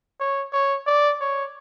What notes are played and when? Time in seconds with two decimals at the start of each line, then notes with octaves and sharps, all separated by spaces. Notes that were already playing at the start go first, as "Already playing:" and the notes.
0.20 C#5
0.53 C#5
0.87 D5
1.21 C#5